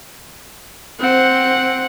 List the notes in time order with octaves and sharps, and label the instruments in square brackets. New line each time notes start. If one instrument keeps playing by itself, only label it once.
[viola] C4 [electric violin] F#5